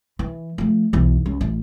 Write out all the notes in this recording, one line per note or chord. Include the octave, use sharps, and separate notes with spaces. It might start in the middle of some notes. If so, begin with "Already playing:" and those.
E3
F3 A3
B1 E2
C#2
A1